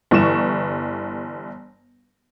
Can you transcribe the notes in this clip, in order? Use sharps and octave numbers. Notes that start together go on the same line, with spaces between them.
G1 E3 C#6 E7